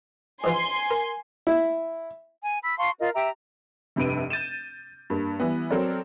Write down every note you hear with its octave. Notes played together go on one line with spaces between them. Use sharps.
G#2 E3 F4 G#5 C6
A#4
E4
G#5
B5 E6
F5 A5 C6 C#6
F4 A#4 D#5
G4 E5 A#5
F1 G2 C3 B4 D7 D#7
G6 A6 D#7 E7
G2 A#3
E3 G3 B3
F#3 C4 A4 A#4 D5